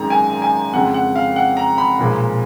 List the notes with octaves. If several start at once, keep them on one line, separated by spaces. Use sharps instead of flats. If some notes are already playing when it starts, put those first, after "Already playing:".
Already playing: G#1 F#2 D#3 G#3 A#5
G#5
G#5
F2 C#3 F3 G#3 F#5
F#5
F5
F#5
A#5
B5
B1 A#2 F3 G#3